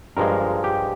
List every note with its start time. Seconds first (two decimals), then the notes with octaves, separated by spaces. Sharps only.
0.17 G2 F3 G#3 A#4
0.64 G4